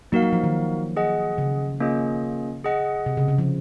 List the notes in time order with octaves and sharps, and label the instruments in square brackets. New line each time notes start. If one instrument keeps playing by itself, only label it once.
[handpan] F#3 A#3 [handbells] D#4 F#4 A#4 F5
[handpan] F#3
F3
D#3
[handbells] G#4 D#5 F#5
[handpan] C#3
[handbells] A#3 C#4 F4 G#4 D#5
G#4 D#5 F#5
[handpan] C3
C#3
C#3
F3